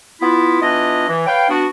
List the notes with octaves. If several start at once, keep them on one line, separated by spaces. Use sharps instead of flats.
B3 E4 F4
E3 B3 D4 F4 D#5
E3
B4 C#5 F5 G5
B3 D4 F#4